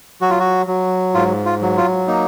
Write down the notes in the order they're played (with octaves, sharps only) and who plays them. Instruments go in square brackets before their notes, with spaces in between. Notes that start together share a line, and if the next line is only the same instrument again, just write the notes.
[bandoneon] F#3 F#4
F4
F#4
F#3
G#2 F4
F4
F#3
F4
A#3 D#4